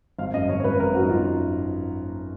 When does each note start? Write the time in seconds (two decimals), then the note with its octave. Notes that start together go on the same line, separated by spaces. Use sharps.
0.19 G#1 F5
0.34 F#2 D#5
0.49 G#1 C#5
0.60 C#5
0.64 G#1 B4
0.79 G#1 A#4
0.94 F#2 F#4
1.02 D#4
1.09 G#1 F4